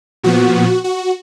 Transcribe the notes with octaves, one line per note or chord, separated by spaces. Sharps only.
A#2 F3 B3 F#4
F#4